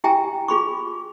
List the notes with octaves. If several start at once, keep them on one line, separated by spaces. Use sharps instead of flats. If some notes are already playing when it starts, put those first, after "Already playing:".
E4 G4 E5 G5 G#5 A#5
F4 G#4 B5 C#6